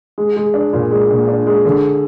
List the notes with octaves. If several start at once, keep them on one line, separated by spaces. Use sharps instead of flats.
G#3
G#3
D4
A#2
G#3
A#1
D4
G#3
D3